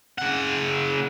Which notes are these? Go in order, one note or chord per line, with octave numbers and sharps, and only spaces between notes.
C#3 F#5